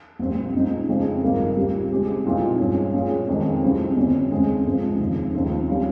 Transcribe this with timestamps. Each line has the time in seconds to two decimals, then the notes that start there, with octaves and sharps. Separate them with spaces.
0.19 A#1 A#2 G3 C4
0.54 A#1 A#2 G#3 C4 D#4
0.88 F2 C#3 G#3 C4
1.22 G#1 G2 D#3 A#3 F4
1.56 A#2 G3 C4 G4
1.91 C#3 G#3 C4 G4
2.25 C2 A#2 F3 C4 D#4
2.59 G2 F3 G#3 C#4
2.94 A#2 G3 C#4 G#4
3.28 F2 D#3 G#3 C#4
3.63 C2 C3 G3 C4 F4
3.96 G1 F2 C3 G3 C#4
4.31 D#2 C#3 G#3 C4
4.66 G#2 F3 C4
4.99 F1 D#2 C#3 G#3
5.34 D#2 C#3 F3 C4
5.68 G3 C#4 F4